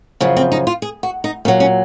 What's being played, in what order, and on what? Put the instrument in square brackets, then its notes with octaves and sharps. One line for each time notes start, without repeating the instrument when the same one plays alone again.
[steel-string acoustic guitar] F#2 C#3 F3
C4
D#4
F4
G#4
F#4
D#4
A#2 C#4
F#3
C#4